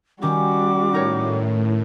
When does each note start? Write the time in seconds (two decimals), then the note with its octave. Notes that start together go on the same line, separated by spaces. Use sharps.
0.22 D#3 G3 C#4 F#4 D6
0.93 A2 D#4 A#4 C#5